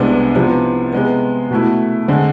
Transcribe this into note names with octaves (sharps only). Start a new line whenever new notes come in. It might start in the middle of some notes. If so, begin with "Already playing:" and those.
Already playing: C2 C3 G#3 B3 D4
C3 F3 B3
C3 G#3 B3
B2 A3 E4
D3 G#3 C4